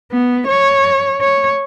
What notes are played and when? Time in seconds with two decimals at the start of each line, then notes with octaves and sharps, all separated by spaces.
0.12 B3
0.47 C#5
1.21 C#5